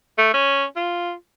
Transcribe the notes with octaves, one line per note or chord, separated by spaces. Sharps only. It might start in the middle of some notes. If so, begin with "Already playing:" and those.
A3
C#4
F4